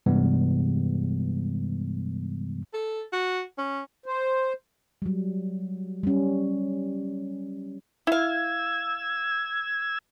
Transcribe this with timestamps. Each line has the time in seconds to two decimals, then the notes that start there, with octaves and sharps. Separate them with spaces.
0.06 G2 C3 E3 G3 G#3 B3
2.73 A4
3.12 F#4
3.58 C#4
4.06 C5
5.02 F#3 G3
6.03 G3 C#4
8.07 E4 F5 E6 G#6